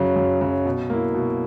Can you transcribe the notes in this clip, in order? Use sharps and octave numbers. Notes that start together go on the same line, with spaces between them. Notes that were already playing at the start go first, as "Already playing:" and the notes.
Already playing: F#2 C#3 F#3
F#2
C#3 F#3
B2
A#3 E4
B2